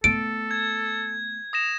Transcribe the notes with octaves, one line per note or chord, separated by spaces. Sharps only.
A3 B3 A4 D7
G#6
D#6 A#6 E7